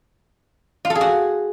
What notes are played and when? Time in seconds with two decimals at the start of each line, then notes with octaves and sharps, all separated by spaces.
0.85 F4
0.90 A4
0.95 G#4
1.01 F#4